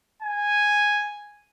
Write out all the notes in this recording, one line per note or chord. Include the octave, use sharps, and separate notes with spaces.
G#5